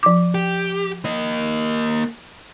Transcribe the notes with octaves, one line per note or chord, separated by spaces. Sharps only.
F3 D6
G4
A#3 D#5